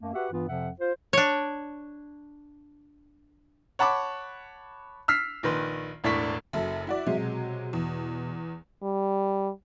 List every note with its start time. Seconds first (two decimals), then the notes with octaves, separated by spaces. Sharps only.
0.02 F#2 A3 A#3
0.14 F#4 G4 B4 E5 F#5
0.32 G2 E3 B3 F4
0.48 F2 C3 F3 E5 F#5
0.80 F4 C5
1.13 D4 C#5
3.79 C#5 F#5 A5 B5 D6
5.08 E6 F6 B6 C7
5.43 A#1 D#3 B4 C6
6.04 E1 A2 D4 C#6 B6
6.53 F#1 F#2 A4 E5
6.87 E4 F#4 D5
7.06 C3 F#3 G#3 E5
7.18 B2
7.73 E2
8.83 G3